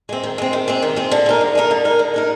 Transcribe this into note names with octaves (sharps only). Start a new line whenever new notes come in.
G#3 C4
D#3
G#3 C4
D#3
G#3 C4
D#3
G#3 C4
D3
G#3 D#4 A#4
D3
G#3 D#4 A#4
D3
G#3 D#4 A#4
D3
G#3 D#4 A#4